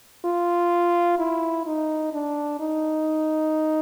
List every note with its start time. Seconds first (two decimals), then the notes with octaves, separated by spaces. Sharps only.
0.25 F4
1.19 E4
1.66 D#4
2.13 D4
2.60 D#4